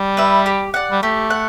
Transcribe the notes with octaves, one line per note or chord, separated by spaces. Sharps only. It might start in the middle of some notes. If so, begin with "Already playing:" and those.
Already playing: G3
B4 E5
G4
D5 F#5
G3
A3 G4
F#5